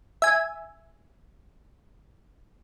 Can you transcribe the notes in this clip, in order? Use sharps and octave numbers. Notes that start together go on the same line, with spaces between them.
E5 G#5